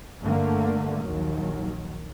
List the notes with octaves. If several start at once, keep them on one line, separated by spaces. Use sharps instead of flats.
G2 D3 A3 A#3
A#1 D#2 D#3 F#3